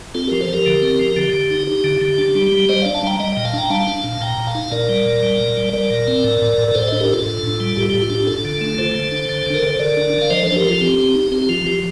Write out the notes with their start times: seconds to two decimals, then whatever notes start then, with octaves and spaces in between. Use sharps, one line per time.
0.15 C4 F4 A4
0.27 F3 G4 A#4
0.41 A4 C5
0.49 F3 G4 A#4
0.66 D3
0.82 C4
0.99 F3
1.16 D3 G4
1.33 D3
1.51 D#4
1.67 D#4 G4
1.84 D3
2.01 D3
2.18 D4
2.35 G3
2.52 G3
2.69 G3 C5 D#5
2.82 D4 D5 F5
2.94 F5 A5
3.03 G3 G5 A#5
3.20 G3 D#5 G5
3.32 A#2 D#5 G5
3.45 F5 A5
3.53 D4 G5 A#5
3.70 G3 F5 A5
3.87 D4
4.04 A#2
4.21 A#2 G5 A#5
4.38 A#2
4.47 F5 A5
4.55 D#4
4.72 A#2 A#4 D5
4.89 G3
5.06 A#2
5.23 G3
5.40 A#2
5.57 G3
5.73 G3 A#4 D5
5.90 A#2
6.08 C4
6.24 A2
6.42 A2
6.58 A2
6.68 A#4
6.75 A2 A4 C5
6.87 D4 C5 D#5
7.00 G4 A#4
7.09 D4 F4 A4
7.26 A2
7.43 A2
7.60 G3
7.77 A2 G4
7.90 A2 G4
8.02 F4
8.10 D4
8.15 G4
8.27 D4 F4 A4
8.45 D3
8.61 A3
8.78 D3 A4 C5
8.95 D3
9.12 D4
9.29 D3
9.47 D3
9.54 A#4
9.62 D3 C5
9.79 D3 A#4 D5
9.97 D4
10.14 D4
10.21 F5
10.30 F3 C5 D#5
10.43 F3 A4 C5
10.56 G4 A#4
10.64 F3 F4 A4
10.75 A4
10.81 C4 G4
10.98 C4
11.15 D#4
11.32 C4 G4
11.42 G4
11.49 F3 F4
11.66 F3 G4